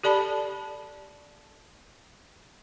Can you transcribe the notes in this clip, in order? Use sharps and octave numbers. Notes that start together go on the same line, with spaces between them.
G4 A4 D5 A5 B5